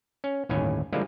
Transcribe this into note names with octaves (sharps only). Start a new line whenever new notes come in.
C#4
G1 D#2 A2 C#4 G#5
D3 F3 G3 G#3 A#3 E4